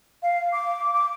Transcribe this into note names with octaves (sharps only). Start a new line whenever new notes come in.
F5
D6
D6